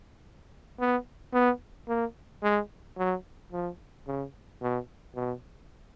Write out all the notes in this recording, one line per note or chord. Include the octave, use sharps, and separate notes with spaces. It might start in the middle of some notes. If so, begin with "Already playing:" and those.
B3
B3
A#3
G#3
F#3
F3
C#3
B2
B2